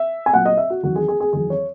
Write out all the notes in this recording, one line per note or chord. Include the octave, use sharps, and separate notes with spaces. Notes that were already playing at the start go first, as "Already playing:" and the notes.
Already playing: E5
G#5
A#2 F#3 F#5
D#5
E5
F#4
E2 D#3 F#3 F#4
G#4
G#4
G#4
E2 D#3 F#3 G#4
C#5